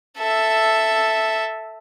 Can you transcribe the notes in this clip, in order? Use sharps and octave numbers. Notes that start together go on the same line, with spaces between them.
A4 E5